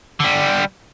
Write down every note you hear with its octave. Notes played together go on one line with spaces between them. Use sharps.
D3 G3